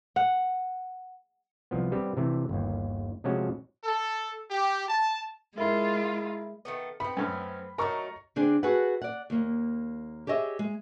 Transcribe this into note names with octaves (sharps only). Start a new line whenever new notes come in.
F#5
C2 F3 B3
G3 B3 C4 G4
C3 E3 A3
G1 D#2
C3 F3 G#3 A3 C#4 F#4
A4
G4
A5
G#3 E4 F4 A4 A#4 E5 B5
D#3 A3 B3
B3 C4 B5
F#2 A3 C#4
F#3 A3 D#4 A#4 A#5 C#6
D3 C4 D4 G#4
F#4 G#4 A4 B4 F#5
D5 F#5
D#2 A#3
G4 G#4 C#5 D#5 E5
G#3